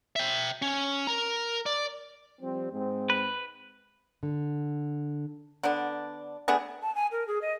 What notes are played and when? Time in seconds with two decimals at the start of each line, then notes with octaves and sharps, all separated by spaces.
0.16 E5 G5
0.62 C#4
1.07 A#4 A#5
1.66 D5
2.40 F3 G3 C4
2.72 G#2 G#3 C4
3.10 B4
4.23 D3
5.63 D3 B3 D4
6.48 A3 B3 D4 G#4
6.82 A5
6.95 G#5
7.12 A#4
7.27 G#4
7.42 D#5